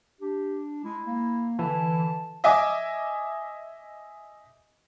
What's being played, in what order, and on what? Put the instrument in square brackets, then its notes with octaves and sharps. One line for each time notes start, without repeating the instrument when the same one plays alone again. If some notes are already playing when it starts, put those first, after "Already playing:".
[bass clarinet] D4 [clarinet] G4
[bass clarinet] G#3 [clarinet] E4
[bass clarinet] A#3
[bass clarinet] D3 [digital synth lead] E3 [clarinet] A5
[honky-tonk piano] D#5 E5 G#5 D6